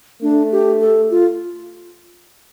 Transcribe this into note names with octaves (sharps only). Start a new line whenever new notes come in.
A3 D4
G4
A4
F4